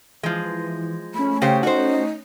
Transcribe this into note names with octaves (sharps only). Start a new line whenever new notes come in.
E3 F3 G#3
A3 C#4 B5
C#3 G4 C5 G5
D#4 F#4 C5